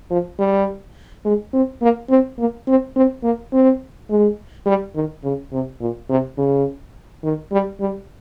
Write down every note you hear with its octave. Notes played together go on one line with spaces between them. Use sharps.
F3
G3
G#3
C4
A#3
C4
A#3
C4
C4
A#3
C4
G#3
G3
D#3
C#3
C3
A#2
C3
C#3
D#3
G3
G3